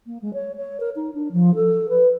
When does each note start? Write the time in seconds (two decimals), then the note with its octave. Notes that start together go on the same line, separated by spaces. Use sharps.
0.07 A#3
0.22 G#3
0.34 C#5
0.56 C#5
0.80 A#4
0.96 D#4
1.14 D4
1.32 F3
1.55 A4
1.89 B4